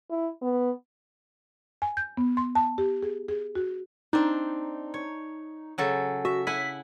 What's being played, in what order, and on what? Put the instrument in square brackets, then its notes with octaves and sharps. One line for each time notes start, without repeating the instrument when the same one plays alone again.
[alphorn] E4
B3
[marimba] G#5
G6
B3
C6
A5
G4
G#4
G#4
F#4
[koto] C4 D4 [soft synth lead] D#4
[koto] C#5
C#3 F#3 A4
[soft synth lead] F#4 [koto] E5
[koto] E4 F#5 G#5 [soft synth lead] B6